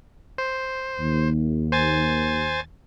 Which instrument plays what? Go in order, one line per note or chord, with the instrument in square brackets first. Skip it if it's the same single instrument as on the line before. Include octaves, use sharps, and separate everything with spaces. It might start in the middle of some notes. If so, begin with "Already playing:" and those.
[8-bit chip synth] C5
[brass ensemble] D#2
[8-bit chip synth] C5 G#5 A6